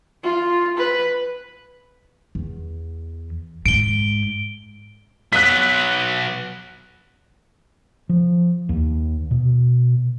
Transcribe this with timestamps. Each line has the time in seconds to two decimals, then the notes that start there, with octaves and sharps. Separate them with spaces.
0.23 F4
0.78 B4
2.35 E2
3.66 G#2 D7 G7
5.33 F#3 B3 F#6 B6
8.09 F3
8.69 D#2
9.31 B2